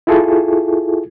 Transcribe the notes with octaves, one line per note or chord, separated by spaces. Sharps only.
E4 F4 G#4 A4